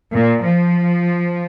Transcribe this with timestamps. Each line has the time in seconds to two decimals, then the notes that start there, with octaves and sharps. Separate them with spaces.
0.13 A#2
0.43 F3